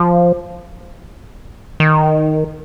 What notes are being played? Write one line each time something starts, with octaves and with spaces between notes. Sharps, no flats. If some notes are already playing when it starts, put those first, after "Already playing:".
Already playing: F3
D#3